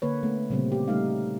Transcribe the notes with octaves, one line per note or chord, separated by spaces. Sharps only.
D3 A#3 B4 C#5
A3 B3
A#2 C#3 G3 A#3 C4
G4
G3 A3 D#4 F5